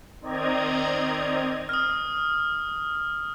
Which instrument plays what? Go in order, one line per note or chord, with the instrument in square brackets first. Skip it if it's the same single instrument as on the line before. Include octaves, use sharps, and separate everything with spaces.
[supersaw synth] D#3 C4 D5 D#5 A#5 G#6
[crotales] D#6 F6